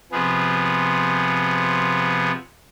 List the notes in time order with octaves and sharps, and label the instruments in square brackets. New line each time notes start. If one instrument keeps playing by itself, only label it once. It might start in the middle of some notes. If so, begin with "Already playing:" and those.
[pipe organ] C3 F3 B3 G#4